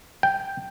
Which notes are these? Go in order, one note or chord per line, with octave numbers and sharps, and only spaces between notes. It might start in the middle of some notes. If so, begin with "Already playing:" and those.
G5